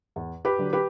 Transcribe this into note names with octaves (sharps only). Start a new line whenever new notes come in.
E2
G4 B4
D3 F#3
G4 B4